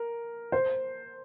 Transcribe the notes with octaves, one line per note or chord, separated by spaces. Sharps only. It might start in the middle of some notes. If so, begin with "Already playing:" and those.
Already playing: A#4
C5